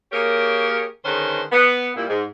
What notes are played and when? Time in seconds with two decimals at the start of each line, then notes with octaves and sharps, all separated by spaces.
0.12 A#3 G4 G#4 A#4 C#5
1.05 D3 D#3 G#3 C#4 B4 C5
1.52 B3
1.96 A#2 G3 E4
2.08 G#2